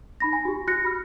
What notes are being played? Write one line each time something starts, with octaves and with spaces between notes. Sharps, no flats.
D#4 B5 A#6
G#5
F#4 G4
F#4 F#6 A#6 C#7
B5 F6